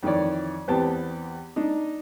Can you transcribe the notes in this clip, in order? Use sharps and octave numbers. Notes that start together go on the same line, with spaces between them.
F2 D#3 E3 C#5 D5
E2 B3 C4 G4 A5
D4 D#4